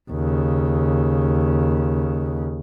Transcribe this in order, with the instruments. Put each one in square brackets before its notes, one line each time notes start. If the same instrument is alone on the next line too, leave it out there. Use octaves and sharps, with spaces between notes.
[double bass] D#2 C#3